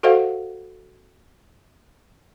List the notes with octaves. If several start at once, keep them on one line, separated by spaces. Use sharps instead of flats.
F#4 A4 C5 D#5 F5 F#5